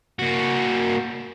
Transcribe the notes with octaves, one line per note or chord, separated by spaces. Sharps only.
A#3 F#4